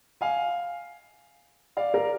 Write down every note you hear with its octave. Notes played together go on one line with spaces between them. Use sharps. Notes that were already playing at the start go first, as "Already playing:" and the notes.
F5 G#5
D5 F5
A#4 D5